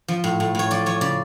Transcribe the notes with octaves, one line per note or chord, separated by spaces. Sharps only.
F3
A2
A2
A2 C#5
F3 D5
F3 C#5
C#3 D5